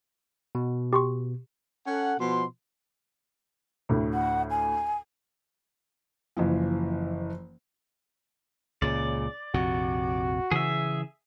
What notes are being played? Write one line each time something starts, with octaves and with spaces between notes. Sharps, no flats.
B2
G4 C6 C#6
C#4 A4 F#5
B2 F3 C6
D2 A2
F#5
G#5
F#1 E3 F3
C#2 A#2 C#3 D5
A#1 F2 C3 F#4
C#3 E3 G#4 E5